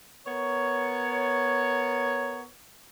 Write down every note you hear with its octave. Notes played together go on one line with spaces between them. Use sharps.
B3 A#4 C#5